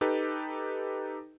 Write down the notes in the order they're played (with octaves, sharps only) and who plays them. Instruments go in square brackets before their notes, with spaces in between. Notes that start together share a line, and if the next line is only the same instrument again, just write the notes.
[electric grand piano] D#4 G4 A4 B4